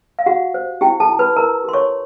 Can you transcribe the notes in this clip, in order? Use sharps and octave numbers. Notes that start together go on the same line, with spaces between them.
F5
F#4 G4 F#5
C5
E4 G4 G5
A4 A5
E4
B4 B5
E4 A#4 A#5
G4 C6
C#5 C#6